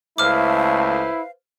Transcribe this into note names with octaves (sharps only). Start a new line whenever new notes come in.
C#2 A3 E4 B4 C5 F5 D6 F6